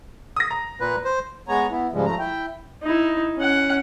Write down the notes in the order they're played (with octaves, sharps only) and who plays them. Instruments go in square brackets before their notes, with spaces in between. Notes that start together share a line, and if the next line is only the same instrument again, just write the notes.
[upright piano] D#6 A#6
A#5
[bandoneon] A#2 B4
C5
[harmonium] G#3 B3 C#5 G#5 A#5
B3 E4
G#2 C#3 F3 G3 G#3
F3 A3 A#5
E4 G5
[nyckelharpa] D#4 E4
C#4 F#5